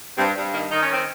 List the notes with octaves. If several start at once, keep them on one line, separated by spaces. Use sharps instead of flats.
G2 C4
G2 G3
D#3 A#3
D#3 D#4
C#4
C4